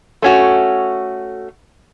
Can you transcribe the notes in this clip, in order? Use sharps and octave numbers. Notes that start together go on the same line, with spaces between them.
A3 C#4 F#4